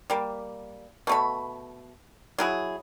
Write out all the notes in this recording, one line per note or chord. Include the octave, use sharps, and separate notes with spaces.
G3 A#3
B2 A3 B5
F#3 E4 G#4